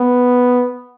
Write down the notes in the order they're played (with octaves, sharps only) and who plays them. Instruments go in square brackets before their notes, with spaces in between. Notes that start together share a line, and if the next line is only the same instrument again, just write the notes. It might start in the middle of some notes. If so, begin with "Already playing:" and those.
Already playing: [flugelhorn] B3